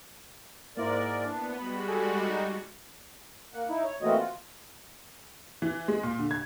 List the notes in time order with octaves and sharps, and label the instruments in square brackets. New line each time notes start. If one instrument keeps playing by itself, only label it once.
[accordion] G#2 A#4 D5 [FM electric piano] A#3 E4 C5
[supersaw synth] B3 [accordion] D4
[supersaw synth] G3 G#3 F#4 [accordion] B5
[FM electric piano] A4 G#5
[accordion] D#4
[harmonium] A#3 F#5
D#4 E4
C#5
E3 A3 A#3 C4 F#4 D#5
F4 F#4
[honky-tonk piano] E3
G#3
A#2
D3
G#6